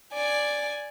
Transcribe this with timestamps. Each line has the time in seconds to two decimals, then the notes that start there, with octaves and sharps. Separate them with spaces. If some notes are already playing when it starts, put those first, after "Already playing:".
0.14 D5 G#5